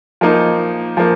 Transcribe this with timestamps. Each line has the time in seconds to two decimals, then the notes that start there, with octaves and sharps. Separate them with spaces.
0.21 F3 A#3 D#4
0.97 F3 A#3